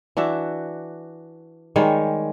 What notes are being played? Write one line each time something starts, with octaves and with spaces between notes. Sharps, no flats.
E3 D4 F#4 E5
D#3 G3 G#3 C#5